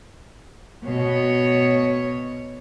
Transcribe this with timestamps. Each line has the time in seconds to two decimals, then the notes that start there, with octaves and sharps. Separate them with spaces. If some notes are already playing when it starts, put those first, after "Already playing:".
0.85 B2 C#5